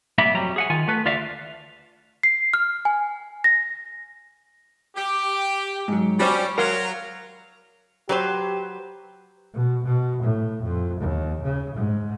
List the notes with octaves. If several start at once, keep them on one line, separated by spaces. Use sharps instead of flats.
C2 A#3 B3 G4 E5 B5
F2 F#3 G3 G4 A#5
G#4 F#5 G#5
D#3 F4 G#5
A3 B3 B4
D2 F4 D5 E5 F5
C7
F6
G#5
A#6
G4
G#2 F#3
G3 C#4 F#4 C5 D5
F#3 A#4 F5 F#5 A#5 C6
F#3 G4 B4 C5
B2
B2
A2
F2
D#2
C#3
G#2